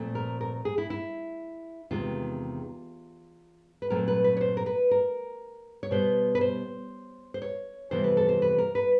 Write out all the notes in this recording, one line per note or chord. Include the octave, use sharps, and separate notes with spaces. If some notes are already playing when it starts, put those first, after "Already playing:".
Already playing: A#2 F3 A3 C4
A#4
A#4
G#4
E4
E4
E2 C3 D#3 G#3 F4
B4
A#2 F#3 A3 C4 A#4
B4
B4
C#5
C5
A#4
B4
A#4
C#5
B2 G3 B3 C5
B4
C5
C5
C#5
F2 C3 E3 G3 B3 C5
B4
A4
C5
B4
A#4
B4